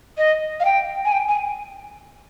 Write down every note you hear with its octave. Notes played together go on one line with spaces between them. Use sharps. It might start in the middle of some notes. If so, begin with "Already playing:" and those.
D#5
F5
G5
G#5
G5
G#5